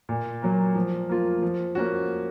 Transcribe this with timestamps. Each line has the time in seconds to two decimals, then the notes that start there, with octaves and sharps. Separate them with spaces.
0.09 A#2
0.42 F#3 A#3
0.75 F3
1.09 A#3 F4
1.42 F3
1.75 A#3 C#4 F#4